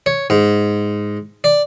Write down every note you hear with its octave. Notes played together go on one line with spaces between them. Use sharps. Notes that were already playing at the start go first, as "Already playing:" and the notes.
C#5
G#2
D5